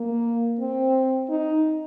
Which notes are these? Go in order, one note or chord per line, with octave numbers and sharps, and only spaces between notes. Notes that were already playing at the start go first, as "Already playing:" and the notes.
Already playing: A#3
C4
D#4